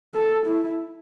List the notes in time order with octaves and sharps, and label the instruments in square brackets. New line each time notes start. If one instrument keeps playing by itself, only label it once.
[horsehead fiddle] A4
E4